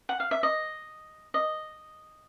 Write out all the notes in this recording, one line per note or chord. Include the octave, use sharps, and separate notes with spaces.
F#5
F5
E5
D#5
D#5